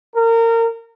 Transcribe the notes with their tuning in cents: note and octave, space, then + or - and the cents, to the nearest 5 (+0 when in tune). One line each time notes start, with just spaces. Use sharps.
A#4 -25